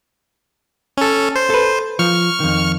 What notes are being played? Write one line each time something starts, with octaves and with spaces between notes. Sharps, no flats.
C#4 A4
C5
A4 B4
F3 C#6 F6
F2 D#3